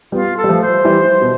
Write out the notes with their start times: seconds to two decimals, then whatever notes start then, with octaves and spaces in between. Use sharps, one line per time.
0.12 G3 B3 F4
0.37 A4
0.44 G3
0.49 F3 A3
0.61 C5
0.85 E3 G3
1.21 B2